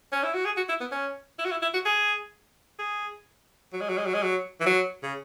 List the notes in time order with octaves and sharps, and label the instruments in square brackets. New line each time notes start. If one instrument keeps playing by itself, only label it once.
[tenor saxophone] C#4
E4
F#4
G#4
F#4
E4
B3
C#4
E4
F#4
E4
E4
F#4
G#4
G#4
F#3
G#3
F#3
G#3
F#3
G#3
F#3
E3
F#3
C#3